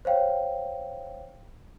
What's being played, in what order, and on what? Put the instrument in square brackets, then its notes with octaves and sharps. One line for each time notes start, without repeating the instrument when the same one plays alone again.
[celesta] C5 C#5 F5 G5